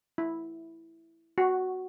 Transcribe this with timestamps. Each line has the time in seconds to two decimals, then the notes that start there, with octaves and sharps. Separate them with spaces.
0.18 E4
1.38 F#4